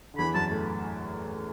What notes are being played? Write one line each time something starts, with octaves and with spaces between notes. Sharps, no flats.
D3
E2 E3 B5
F#2 F#3 A5
A2 A3